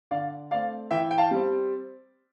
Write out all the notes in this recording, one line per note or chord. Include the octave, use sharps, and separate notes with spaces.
D3 D5 F5
A3 C4 D5 F5
E3 E5 G5
G5
F5 A5
G3 C4